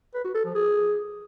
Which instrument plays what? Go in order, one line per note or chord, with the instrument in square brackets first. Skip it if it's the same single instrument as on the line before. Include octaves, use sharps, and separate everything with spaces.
[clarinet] B4
F#4
A4
F3
G#4